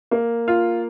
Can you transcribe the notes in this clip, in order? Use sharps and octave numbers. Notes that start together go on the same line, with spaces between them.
A#3
F4